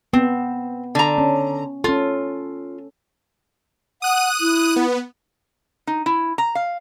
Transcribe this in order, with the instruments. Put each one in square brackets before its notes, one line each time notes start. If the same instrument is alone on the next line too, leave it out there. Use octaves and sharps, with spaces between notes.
[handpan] B3 [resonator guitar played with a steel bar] C4
[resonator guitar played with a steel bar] D3 A#5
[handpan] C#4
[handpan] C#4 A4 [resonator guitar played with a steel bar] F4
[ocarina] F#5 [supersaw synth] D#6 F#6 D#7
[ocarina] E4
[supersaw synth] B3
[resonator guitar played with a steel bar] D#4
E4
A#5
F5